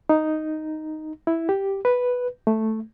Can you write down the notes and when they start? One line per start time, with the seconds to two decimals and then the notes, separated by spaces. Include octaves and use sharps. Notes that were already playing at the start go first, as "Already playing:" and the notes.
0.09 D#4
1.27 E4
1.49 G4
1.85 B4
2.47 A3